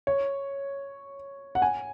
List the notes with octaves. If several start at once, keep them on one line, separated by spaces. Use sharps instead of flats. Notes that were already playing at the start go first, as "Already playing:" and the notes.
C#5
F#5
G#5